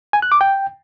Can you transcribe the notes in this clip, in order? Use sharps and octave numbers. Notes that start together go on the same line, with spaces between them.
G#5
F#6
D6
G5